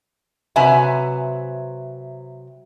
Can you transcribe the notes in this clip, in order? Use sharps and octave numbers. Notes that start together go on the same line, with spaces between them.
C3 F#3 B4 E5 G#5